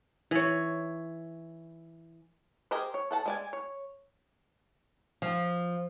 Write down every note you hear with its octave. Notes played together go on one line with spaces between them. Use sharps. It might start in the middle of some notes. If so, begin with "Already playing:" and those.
E3 C#5
G4 G#4 A#4 C5 D#5
C#5
A4 F#5 A5
G#3 D5 G#5
C#5
F3